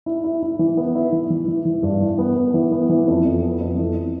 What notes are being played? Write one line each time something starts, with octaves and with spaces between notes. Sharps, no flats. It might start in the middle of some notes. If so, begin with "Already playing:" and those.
E4
E4
E4
E3
B3
E4
E3
E3
E3
E3
G2
E3
B3
B3
E3
B3
E3
F2
F2
B3
F2
E3